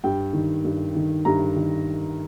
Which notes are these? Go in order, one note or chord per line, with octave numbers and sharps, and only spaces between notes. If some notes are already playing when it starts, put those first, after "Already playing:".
G2 G5
D#3
G2
D#3
G2 A#5
D#3